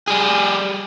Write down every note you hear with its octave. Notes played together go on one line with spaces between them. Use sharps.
G3 G#4